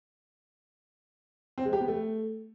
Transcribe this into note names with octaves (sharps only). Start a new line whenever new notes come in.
C4
G#3
G4
B3
A3